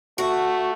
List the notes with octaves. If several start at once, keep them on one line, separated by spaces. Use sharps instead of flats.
A3 F#4